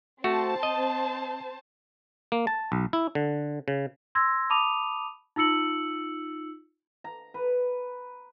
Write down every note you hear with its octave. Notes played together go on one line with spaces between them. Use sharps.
A3 C4 F#4 C5 A5
D#5
A#3
A5
B1
E4
D3
C#3
C6 E6 G#6 A#6
A5 B5 D6 D#6 D#7 F7
D#4 F4 E6 C#7 F#7
A#5
B4